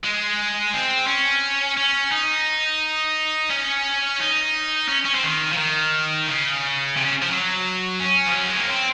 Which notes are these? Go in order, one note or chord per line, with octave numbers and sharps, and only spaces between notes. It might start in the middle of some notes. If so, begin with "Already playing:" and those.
G#3
C4
C#4
C#4
D#4
C#4
D#4
C#4
C#4
C4
D#3
F3
D#3
C#3
C3
C#3
F3
F#3
C#4
F3
F#3
G#3
A#3
C4